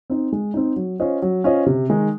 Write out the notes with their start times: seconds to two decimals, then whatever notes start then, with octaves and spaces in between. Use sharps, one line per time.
0.10 C4 D#4
0.32 G#3
0.54 C4 D#4
0.76 F#3
1.00 C#4 F4 C5 D#5
1.22 F#3
1.44 C#4 F4 C5 D#5
1.66 C3
1.89 D#3 G#3 D#4